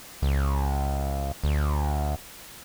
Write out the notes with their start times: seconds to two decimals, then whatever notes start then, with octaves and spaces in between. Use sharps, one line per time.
0.22 C#2
1.44 D2